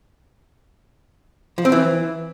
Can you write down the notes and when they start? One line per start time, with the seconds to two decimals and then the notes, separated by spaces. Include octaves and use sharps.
1.58 F3
1.65 C4
1.72 E3